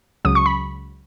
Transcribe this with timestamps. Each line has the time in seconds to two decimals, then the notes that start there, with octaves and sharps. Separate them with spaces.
0.25 C#2 C#3 F#3 D#6
0.35 C#6
0.46 B5